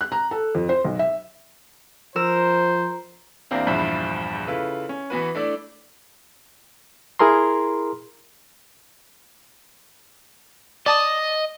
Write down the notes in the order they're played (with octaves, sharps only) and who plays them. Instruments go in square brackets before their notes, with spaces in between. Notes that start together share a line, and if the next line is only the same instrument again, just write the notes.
[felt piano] F#6
A#5
A4
F2
C5
B1
E5
[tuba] F3 [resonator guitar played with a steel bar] A#4 [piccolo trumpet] C5 [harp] E6
[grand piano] E2 A#3 C4 D4
A#1 E2 G2 F3 E5 B5
C#3 E4 F4 A4 B4
C#4
E3 B3 F#4 B4
A3 D4 E4 D5
[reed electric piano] E4 G#4 A#4 A#5 C6
[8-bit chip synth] D5 A5 D#6 [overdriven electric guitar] D#5